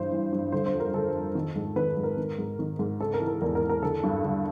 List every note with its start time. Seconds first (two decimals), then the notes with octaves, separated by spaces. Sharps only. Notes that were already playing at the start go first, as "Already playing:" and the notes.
Already playing: G2 E3 C5
0.12 E3
0.33 G2
0.52 D3 C5
0.66 C5
0.73 F2
0.80 A#4
0.93 D3 A4
1.15 F2
1.35 D#3
1.56 G#2
1.76 D#3 B4
1.97 G#2
2.03 A#4
2.17 D#3
2.39 G#2
2.59 D#3
2.79 G#2
3.00 C#3 A4
3.14 A#4
3.20 E3
3.27 A#4
3.41 E2 A#4
3.55 A#4
3.62 E2
3.69 A#4
3.83 D3 A4
4.03 G2
4.24 D3